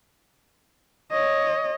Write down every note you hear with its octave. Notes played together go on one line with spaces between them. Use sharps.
C#5 D#5